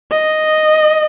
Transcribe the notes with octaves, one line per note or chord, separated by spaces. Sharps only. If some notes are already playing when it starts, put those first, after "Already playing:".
D#5